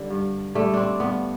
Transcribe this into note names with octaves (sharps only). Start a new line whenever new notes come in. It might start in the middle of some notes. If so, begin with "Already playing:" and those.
Already playing: D3 G3
G2
D3 G3 A3
C4 D4
G2 B3